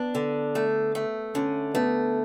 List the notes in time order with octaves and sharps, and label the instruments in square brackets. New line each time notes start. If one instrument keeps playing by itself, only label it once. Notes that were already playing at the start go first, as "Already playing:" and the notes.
Already playing: [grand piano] B3 [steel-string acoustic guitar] D4
[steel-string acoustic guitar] D3
A3
A3
[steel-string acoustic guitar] D3 [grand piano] C#4
[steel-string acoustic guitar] A3 [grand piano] B3